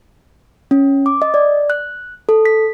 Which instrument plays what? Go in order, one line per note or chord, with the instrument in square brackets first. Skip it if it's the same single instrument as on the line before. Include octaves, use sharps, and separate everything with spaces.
[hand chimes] C#4
D6
D#5
D5
F#6
A4
B6